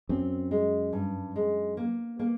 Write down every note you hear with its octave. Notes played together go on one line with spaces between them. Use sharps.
F#2 C4
G#3
G2
G#3
A#3
A#3